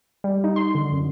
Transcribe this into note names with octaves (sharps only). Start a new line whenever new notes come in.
G3
D#4
C6
D3
F#2